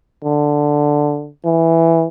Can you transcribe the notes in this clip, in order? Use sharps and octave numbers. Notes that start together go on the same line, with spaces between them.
D3
E3